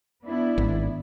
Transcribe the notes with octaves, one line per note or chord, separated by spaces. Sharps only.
B3 D4 E4
G#1